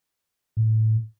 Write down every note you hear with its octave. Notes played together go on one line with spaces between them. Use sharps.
A2